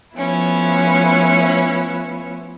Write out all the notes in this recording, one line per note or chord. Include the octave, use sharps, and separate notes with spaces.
F3 A3 B3 C#4 E4